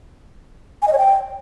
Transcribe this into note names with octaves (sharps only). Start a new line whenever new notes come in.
G#5
D#5
C#5
G5